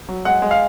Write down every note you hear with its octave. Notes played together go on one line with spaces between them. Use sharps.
F#3
G#3 F#5
G#3
F5